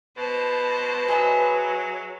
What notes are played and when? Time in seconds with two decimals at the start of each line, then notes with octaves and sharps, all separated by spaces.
0.18 B2 B4 C5 A5
1.08 F#3 G#4 D#5 E5